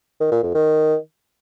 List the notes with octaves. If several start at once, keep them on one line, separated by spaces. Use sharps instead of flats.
D#3
A#2
F2
D#3